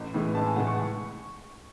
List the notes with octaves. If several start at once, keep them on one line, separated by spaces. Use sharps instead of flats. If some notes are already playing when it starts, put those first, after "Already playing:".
Already playing: A1
A2 E3 G#3
A1 A5
G#5
A2 E3 G#3 F#5
C#6